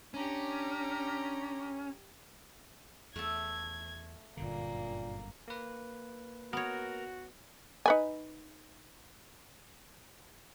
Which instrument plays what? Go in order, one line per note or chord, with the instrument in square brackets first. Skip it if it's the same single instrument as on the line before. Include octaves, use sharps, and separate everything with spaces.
[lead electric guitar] C#4 [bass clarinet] D4 [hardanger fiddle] G4 A#5
[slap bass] E2 [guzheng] A3 A4 [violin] G#6
[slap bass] G1 F#2 D3 [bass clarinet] A#2 [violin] A#3
[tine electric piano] A#3 B4
[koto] B3 C#5 [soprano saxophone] F#4 [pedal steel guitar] A#4
[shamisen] D#4 B4 G#5